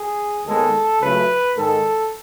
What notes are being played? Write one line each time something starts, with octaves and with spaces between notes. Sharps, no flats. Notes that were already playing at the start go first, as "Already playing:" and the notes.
Already playing: G#4
D#2 D#3 G#3 B3 A4
C#2 C#3 F#3 A3 B4
G#2 D#3 G#3 A4